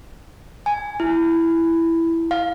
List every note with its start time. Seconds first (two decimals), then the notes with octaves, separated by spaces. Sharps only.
0.66 G#5
1.00 E4
2.31 F5